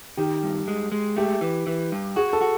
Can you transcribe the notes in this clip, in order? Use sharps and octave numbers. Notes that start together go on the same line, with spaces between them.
D#3 G4
G2
G#3
G#3
A3 G4
E3
E3
G2
F#4 G#4
A4
F#4